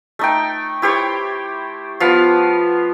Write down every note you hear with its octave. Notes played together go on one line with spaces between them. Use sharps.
A3 D#4 G5
E4 G4 C5 C#5
F3 B3 F5